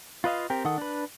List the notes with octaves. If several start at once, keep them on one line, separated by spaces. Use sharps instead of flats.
F4 B4 D#5 F5
C4 G4 A#4
D#3 A4 F#5 D#6
D4 B4